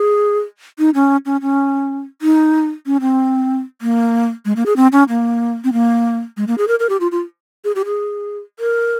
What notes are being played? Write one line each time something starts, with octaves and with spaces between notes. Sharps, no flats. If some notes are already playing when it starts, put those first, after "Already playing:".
Already playing: G#4
D#4
C#4
C#4
C#4
D#4
C#4
C4
A#3
G#3
A#3
G#4
C4
C#4
A#3
C4
A#3
G#3
A#3
G#4
A#4
A#4
G4
F4
F4
G#4
G4
G#4
A#4